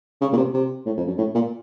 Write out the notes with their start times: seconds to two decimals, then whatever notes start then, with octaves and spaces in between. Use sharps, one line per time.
0.21 C#3
0.32 A#2
0.37 C3
0.53 C3
0.86 A2
0.97 F2
1.07 F#2
1.18 A2
1.34 A#2